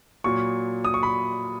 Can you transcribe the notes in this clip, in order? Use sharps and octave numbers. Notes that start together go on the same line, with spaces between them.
A#2 F#3 C#6
D#6
C#6
B5